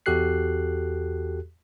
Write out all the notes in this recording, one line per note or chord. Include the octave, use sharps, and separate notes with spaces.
E2 F#4 G4 A4 F#6 C7